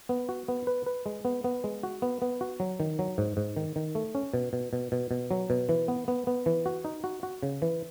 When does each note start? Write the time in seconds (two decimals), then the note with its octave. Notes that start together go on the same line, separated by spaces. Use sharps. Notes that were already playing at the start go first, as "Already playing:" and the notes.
0.09 B3
0.29 F#4
0.48 B3
0.67 B4
0.86 B4
1.06 G#3
1.25 B3
1.44 B3
1.64 G#3
1.83 F#4
2.02 B3
2.22 B3
2.41 F#4
2.60 F#3
2.80 D#3
2.99 F#3
3.18 G#2
3.37 G#2
3.57 D#3
3.76 D#3
3.95 A3
4.15 C#4
4.34 B2
4.53 B2
4.73 B2
4.92 B2
5.11 B2
5.31 F#3
5.50 B2
5.69 E3
5.88 B3
6.08 B3
6.27 B3
6.46 E3
6.66 F#4
6.85 D#4
7.04 F#4
7.23 F#4
7.43 C#3
7.62 E3